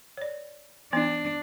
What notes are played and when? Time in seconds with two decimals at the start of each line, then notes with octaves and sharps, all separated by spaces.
0.17 C#5 D5
0.93 E3 B3 D4